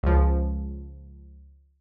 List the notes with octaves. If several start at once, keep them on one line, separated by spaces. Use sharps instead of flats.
C#2 F3